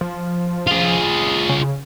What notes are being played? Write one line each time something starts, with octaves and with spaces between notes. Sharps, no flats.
F3
F4 G#4
C#3